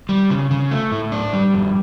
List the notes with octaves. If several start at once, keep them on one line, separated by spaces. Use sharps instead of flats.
G3
C#3
C#3
A3
A2
D4
G3
F2